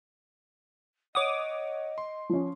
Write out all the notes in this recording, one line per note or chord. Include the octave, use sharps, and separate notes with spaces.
C#5 D#5 F#5 D6 D#6
C6
F3 C#4